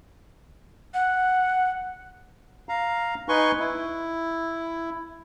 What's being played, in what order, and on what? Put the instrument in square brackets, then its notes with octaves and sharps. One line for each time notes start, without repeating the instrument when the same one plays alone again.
[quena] F#5
[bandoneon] F5 A#5
D#4 B4 G#5 C6 C#6
E4